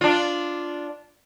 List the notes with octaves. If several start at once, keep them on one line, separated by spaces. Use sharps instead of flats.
D4 F4